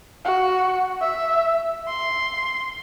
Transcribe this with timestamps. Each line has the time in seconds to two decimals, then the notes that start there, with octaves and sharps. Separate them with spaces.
0.25 F#4
1.01 E5
1.88 C6